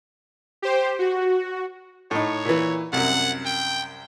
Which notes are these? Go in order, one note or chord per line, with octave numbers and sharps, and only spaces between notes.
G4 C5
F#4
A2 D#4 C#5
A#2 E3
C2 F#2 F#5
G5